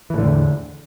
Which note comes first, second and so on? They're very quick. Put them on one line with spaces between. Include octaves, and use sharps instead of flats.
E3 A2 D3 E2